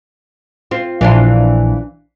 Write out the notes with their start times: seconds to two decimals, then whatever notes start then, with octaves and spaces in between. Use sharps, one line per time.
0.71 C4 F4
1.01 A#1 E3 D4 F4